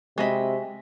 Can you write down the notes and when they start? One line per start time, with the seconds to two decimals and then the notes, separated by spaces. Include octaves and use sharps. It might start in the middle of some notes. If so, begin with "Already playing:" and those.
0.18 C3 G#3 F#4 D#5 E5 B5